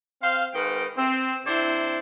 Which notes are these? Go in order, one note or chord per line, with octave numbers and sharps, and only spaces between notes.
C4 C5 F5
G#2 D#3 B4 G5
C4
C3 D4 E4 C5